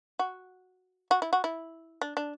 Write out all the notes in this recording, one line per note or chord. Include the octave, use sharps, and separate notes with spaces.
F#4
F#4
E4
F#4
E4
D4
D4